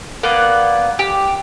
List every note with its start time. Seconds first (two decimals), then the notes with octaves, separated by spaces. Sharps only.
0.23 A#3 B3 D5 F#5
0.99 G4